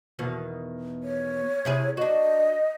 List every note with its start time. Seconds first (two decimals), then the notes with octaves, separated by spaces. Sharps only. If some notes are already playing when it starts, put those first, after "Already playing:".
0.19 E2 B2 D#3
1.03 C#5
1.65 C3 E4 G#4
1.97 D4 F#4 D#5